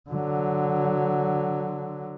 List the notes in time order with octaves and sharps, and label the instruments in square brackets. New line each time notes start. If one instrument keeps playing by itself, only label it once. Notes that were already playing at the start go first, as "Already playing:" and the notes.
[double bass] D3 F#3